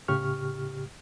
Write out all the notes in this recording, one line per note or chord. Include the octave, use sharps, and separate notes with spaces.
A2 C#3 G4 C#6 F6